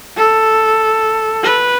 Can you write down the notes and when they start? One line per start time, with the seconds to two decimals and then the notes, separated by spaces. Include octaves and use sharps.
0.17 A4
1.44 B4